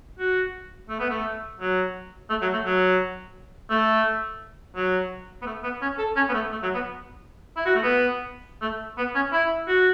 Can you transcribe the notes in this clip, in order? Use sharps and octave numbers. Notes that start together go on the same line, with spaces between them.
F#4
A3
B3
A3
F#3
A3
F#3
A3
F#3
A3
F#3
B3
A3
B3
C#4
A4
C#4
B3
A3
A3
F#3
B3
E4
F#4
A3
B3
A3
B3
C#4
E4
F#4